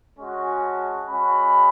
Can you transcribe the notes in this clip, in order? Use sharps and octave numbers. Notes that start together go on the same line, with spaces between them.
G#3 C#4 F#4
A5
G#3 C#4 F#4 B5